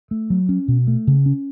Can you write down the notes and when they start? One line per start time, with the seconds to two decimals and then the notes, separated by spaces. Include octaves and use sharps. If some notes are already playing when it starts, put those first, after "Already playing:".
0.11 A3
0.30 F#3
0.49 C#4
0.68 B2
0.87 A3
1.07 C#3
1.26 C#4